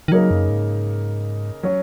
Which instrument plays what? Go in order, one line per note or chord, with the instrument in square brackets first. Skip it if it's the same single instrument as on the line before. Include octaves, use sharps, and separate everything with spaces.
[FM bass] D#3
[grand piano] C#3 A#3 D#4 A#4 [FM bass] F#3
[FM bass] F#2
G#2
[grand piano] F#3 C#4 F#4